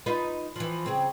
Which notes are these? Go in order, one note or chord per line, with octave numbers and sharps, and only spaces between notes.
D#4 F4 B4
E3 F3
C#3 C4